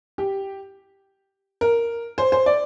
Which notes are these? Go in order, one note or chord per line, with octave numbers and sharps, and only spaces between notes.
G4
A#4
C5
C5
D5